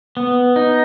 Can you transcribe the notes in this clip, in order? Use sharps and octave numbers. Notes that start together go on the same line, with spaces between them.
B3
D#4